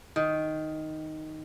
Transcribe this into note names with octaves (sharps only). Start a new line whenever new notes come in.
D#3